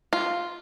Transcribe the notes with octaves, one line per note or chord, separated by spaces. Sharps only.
F4